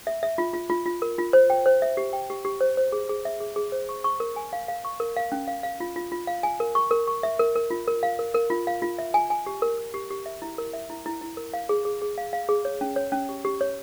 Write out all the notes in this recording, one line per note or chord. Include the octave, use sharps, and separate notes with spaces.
E5
E5
F4
F4
F4
F4
A#4
F4
C5
G5
C5
E5
G4
G5
G4
G4
C5
C5
G#4
G#4
E5
G#4
G#4
C5
C#6
C#6
A#4
G#5
F5
F5
C#6
A#4
F5
C#4
F5
F5
F4
F4
F4
F5
G#5
A#4
C#6
A#4
C#6
E5
A#4
A#4
F4
A#4
F5
A#4
A#4
F4
F5
F4
E5
G#5
G#5
G4
A#4
A#4
G4
G4
E5
E4
A#4
E5
E4
E4
E4
A#4
F5
G#4
G#4
G#4
F5
F5
G#4
C#5
C#4
C#5
C#4
G4
G4
C#5